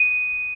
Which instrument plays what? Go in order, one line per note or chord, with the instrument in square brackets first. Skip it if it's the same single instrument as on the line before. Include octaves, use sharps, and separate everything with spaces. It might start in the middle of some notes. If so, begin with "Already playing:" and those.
Already playing: [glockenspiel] D#7